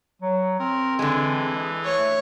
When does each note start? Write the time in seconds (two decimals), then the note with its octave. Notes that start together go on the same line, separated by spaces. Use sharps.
0.22 F#3
0.59 C4 A#4
0.99 D3 E3 G#3
1.85 A3 C#5